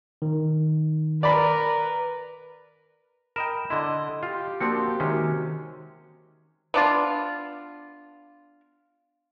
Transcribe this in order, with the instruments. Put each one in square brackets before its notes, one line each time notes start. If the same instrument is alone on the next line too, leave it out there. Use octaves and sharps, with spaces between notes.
[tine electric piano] D#3
[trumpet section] A#4 [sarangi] B4 [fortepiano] D5 B5
[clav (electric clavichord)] A#4 D#5 G5 [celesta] B5 E7
[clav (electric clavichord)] D3 E4 [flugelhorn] D#5 [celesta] C6
[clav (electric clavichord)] F4 [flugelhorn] G4
[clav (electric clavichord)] F3 C4 D4 [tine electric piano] A#3 F#4 [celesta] C6 C#7
[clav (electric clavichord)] C3 G#3 C#4 [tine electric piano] D#3 [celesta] F#4
[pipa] B3 D4 F4